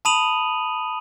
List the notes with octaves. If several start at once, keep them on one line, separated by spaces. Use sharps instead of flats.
A5 B5 D#6 D#7 F7 F#7